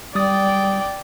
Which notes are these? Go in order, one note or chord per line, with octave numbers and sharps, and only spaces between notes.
G3 D5 G5 D#6 A6